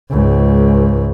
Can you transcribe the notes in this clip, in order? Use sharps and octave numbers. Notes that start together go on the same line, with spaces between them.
C#2 G#2